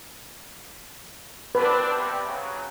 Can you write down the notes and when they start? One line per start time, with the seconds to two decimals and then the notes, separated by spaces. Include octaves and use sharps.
1.55 C4 D4 B4
1.95 C3 G3
2.26 C#3 F#3